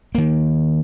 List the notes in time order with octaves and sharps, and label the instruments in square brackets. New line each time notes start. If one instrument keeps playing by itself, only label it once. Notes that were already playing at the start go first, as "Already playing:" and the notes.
[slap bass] D#3 A#3